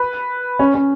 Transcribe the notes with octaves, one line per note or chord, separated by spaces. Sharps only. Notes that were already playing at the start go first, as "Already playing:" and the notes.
Already playing: B4
C#4
C#4